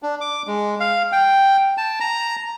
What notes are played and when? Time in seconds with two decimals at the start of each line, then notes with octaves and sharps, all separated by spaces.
0.03 D4
0.21 D6
0.47 G#3
0.80 F5
1.12 G5
1.78 A5
2.00 A#5